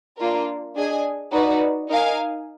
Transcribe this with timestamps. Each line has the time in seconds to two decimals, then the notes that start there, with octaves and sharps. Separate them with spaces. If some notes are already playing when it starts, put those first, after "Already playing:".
0.17 A#3 D4 F4 A#4
0.74 D4 G#4 D#5 G#5
1.31 D#4 F#4 B4 D5
1.89 D#4 A#4 F5 G#5